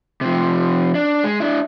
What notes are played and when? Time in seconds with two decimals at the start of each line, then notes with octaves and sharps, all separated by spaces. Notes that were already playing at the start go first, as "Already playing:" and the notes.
0.21 C3 F3
0.95 D4
1.24 G#3
1.40 D4 E4